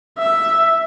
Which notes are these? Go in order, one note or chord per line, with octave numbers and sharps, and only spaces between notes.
E5